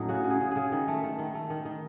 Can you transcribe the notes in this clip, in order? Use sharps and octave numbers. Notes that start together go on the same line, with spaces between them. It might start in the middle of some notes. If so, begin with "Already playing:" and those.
Already playing: A2 F#3 A3 C#4 D#4
C#3 F#4
C#3
G#4
C#3
C#3 G#4
D#3
A3
D#3
D#3
A3
D#3
D#3